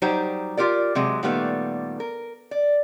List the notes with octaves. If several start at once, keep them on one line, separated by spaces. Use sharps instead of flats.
F#3 G3 D#4 G4 C5 A#5
F4 G4 A#4 D5
C3 F#3 G#3
A#2 D#3 G3 A3 B3
A#4
D5